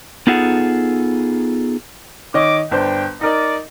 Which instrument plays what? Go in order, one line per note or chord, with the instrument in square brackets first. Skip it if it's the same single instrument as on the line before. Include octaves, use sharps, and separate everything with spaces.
[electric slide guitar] B3 D#4 F4 G#4 A4 F#5
[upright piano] D#3 C#5 D#5 [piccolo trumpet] D6
[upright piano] G1 D4 C5 [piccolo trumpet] G5
[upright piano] D#4 A#4 D#5 [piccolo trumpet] D5